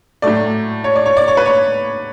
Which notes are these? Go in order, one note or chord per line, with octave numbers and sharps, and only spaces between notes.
A2 F#3 A3 D5
C#5
D5
C#5
D5
C#5
B4
C#5